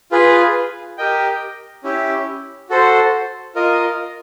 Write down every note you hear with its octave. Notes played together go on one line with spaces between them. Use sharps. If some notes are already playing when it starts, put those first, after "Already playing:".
F4 G#4 B4
G4 A#4 D#5 G5
C#4 E4 G4
F#4 A4 C5
F4 A#4 D#5